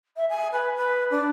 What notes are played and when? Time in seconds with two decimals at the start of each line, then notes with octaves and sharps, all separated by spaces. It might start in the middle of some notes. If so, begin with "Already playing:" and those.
0.16 E5
0.29 G#5
0.52 B4
0.76 B4
1.11 D4